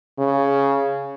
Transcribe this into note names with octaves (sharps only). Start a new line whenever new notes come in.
C#3